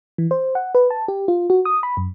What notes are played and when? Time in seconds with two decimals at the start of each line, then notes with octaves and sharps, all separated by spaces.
0.18 E3
0.31 C5
0.55 F#5
0.75 B4
0.90 A5
1.08 G4
1.28 F4
1.50 F#4
1.65 D#6
1.83 B5
1.97 F#2